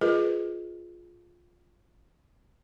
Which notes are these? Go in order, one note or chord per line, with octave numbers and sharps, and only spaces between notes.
F4 G#4 A#4 B4 D#5